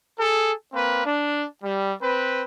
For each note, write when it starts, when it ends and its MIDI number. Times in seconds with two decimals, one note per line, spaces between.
0.18 0.52 68
0.18 0.52 69
0.73 1.01 58
0.73 1.01 60
0.73 1.01 71
1.05 1.45 62
1.62 1.91 55
2.01 2.43 60
2.01 2.43 71